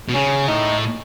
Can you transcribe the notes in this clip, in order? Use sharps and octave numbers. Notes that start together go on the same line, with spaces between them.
B2
C#3 C#4
A2 D#4